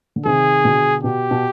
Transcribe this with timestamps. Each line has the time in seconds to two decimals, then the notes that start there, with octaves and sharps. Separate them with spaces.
0.16 D3
0.25 C3 D#3 G#4
0.64 B2 D3
1.03 B2 G4
1.31 B2